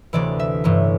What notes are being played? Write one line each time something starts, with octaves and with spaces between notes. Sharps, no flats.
D2 C3 E3 D5
E5
A1 G2 E3